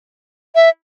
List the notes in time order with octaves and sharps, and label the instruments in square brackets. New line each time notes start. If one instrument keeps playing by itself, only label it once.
[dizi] E5